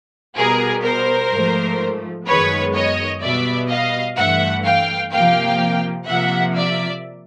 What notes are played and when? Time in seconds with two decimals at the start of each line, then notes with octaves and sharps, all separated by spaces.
0.36 B2 G3 B3 G#4 A#4
0.84 A#4 C5
1.31 G#2 F3 A3
2.26 F#2 D#3 G#3 B3 B4 C#5
2.74 C#5 D#5
3.22 B2 G3 B3 D5 E5
3.69 D#5 F5
4.17 G2 E3 A3 E5 F#5
4.64 F5 G5
5.12 C3 F3 A#3 F5 G5
6.07 C3 F3 A#3 E5 F#5
6.55 D5 E5